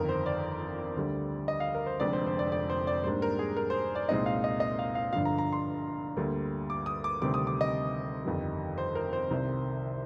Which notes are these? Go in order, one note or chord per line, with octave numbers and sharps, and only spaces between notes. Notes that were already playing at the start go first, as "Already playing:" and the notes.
Already playing: G1 F2 D#3 A#4
C5
D5
D2 D3 G3
D#5
F5
A#4
C5
F1 F2 D3 G#3 D5
C5
C5
D5
D5
C5
D5
G#2 G3 A#3 D4 C5
A#4
G#4
A#4
C5
D5
C2 A#2 G#3 C4 D#4 D#5
F5
D#5
D#5
F5
F5
G1 G2 D3 F3 F5
A#5
A#5
C6
D2 D3 G3 A#3
D6
D#6
D6
D2 C3 D#3 G3 C4 D6
D#6
D6
D#5
G1 F2 D#3 G3
C5
A#4
C5
C2 C3 D#3